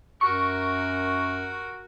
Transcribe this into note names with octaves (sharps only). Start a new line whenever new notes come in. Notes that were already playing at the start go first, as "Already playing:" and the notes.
F#2 F#4 A#4 C#6